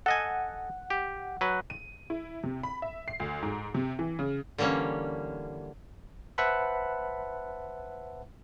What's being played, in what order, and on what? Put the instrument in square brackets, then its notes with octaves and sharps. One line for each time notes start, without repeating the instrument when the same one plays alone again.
[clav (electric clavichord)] A4 D#5 G#5 [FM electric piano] F#5
[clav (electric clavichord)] G4
F#3 B4
[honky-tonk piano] D#7
E4
C3
B5
E5
C7
D2
G#2
C3
E3
C#3
[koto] D3 E3 G3 A#3 C#4
[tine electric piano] B4 C5 E5 F#5 A5 B5